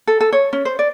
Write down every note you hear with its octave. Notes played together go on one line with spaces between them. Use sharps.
A4
A4
C#5
C#4
C5
D5